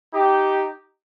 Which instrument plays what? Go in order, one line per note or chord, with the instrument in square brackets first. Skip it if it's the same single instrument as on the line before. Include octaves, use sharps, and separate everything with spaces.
[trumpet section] D#4 G4